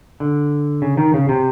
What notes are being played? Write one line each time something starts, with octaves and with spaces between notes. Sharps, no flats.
D3
C#3
D#3
C#3
C3